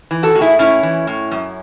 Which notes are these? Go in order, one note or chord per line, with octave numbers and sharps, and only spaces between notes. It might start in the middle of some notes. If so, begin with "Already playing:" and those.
E3
F#4 A4
A2 F#4
E4 G#4
A2 C#4 E4
E3
A2
F#2